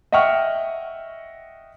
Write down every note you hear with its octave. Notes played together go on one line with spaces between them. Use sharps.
D#5 E5 F#5 G5 C#6 F6